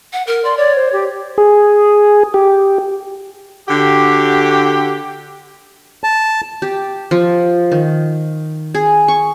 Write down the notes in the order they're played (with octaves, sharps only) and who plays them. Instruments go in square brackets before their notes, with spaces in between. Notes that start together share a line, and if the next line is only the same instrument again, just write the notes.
[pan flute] F#5
A#4
[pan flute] D5 [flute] C6
[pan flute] C#5 [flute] D5
[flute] C5
G4
[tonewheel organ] G#4
G4
[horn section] D3 F#4 G4
[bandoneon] A5
[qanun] G4
F3
D#3
G#4
C#6